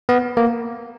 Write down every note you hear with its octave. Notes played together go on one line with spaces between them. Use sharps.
B3
A#3